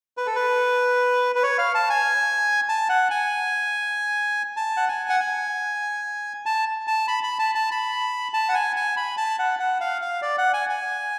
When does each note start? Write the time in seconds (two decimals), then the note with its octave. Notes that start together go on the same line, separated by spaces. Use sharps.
0.17 B4
0.27 A4
0.36 B4
1.35 B4
1.43 C#5
1.58 F5
1.75 A5
1.90 G#5
2.69 A5
2.89 F#5
3.11 G#5
4.57 A5
4.77 F#5
4.89 G#5
5.10 F#5
5.20 G#5
6.46 A5
6.87 A5
7.08 B5
7.24 B5
7.39 A5
7.55 A5
7.71 B5
8.34 A5
8.49 F#5
8.54 G#5
8.76 G#5
8.97 B5
9.17 A5
9.39 F#5
9.59 F#5
9.81 F5
10.02 F5
10.22 D5
10.38 F#5
10.54 G#5
10.69 G#5